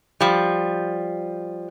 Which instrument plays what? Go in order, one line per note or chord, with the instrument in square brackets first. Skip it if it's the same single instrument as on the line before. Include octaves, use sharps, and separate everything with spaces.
[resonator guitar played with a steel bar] F3 G3